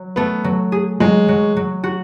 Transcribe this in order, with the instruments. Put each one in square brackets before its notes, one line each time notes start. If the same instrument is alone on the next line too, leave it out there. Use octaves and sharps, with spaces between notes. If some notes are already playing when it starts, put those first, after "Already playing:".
Already playing: [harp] F#3
[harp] A3 [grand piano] B3
[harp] F#3
G#4
[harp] F#3 [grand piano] G#3
[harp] F#3
F#3
F#4